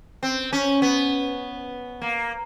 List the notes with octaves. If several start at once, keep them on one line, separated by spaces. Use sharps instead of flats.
C4
C#4
B3
A#3